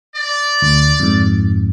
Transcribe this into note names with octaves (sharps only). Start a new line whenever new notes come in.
D5
D2
F2 G#2